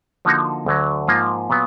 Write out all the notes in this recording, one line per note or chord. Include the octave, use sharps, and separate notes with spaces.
D3 F3 A#3 D#4 F#4
D2 D3 F#3
G#2 F3 A#3 F4
A#2 F#3 B3